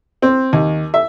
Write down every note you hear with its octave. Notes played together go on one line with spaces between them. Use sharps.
C4
D#2
E5